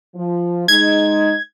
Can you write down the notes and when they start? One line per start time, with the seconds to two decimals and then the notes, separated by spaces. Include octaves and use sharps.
0.15 F3
0.68 G#3 D#4 G#6